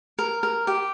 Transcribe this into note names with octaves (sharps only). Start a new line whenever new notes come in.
A#4
A#4
G4